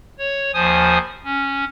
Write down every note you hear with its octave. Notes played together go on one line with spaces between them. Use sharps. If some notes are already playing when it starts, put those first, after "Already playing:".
C#5
D#2 F3 C5 G#5 D#6
C#4